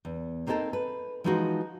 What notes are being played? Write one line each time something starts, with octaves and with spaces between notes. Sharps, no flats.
E2
A#3 C4 D#4 F#4 A4 A#4
B4
E3 F3 G#3 D#4 F4 F#4